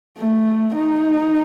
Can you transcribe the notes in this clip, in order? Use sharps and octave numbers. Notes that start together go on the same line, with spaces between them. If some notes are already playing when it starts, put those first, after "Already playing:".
A3
D#4